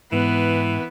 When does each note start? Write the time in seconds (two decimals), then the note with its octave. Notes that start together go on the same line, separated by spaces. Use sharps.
0.12 G#2 E3 B3